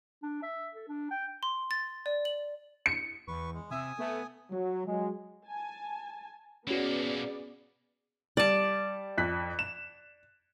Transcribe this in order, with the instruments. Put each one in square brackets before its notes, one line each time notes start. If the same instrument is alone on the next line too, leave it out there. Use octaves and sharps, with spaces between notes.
[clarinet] D4
E5
A4
D4
G5
[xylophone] C6
A6
D5
F#7
[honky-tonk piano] C#7
[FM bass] E2 [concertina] B4 C#6
[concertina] G#3
[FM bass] C3 [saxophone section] E5 [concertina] G#5 D#6
[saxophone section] A3 [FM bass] B3
[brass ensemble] F#3
F#3 G#3
[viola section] G#5 A5
[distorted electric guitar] B2 A#3 [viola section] B3 G#4 D5 [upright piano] C#4 F#4
[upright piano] G3 [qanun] D5 A5
[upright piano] F2 F#6 B6
E7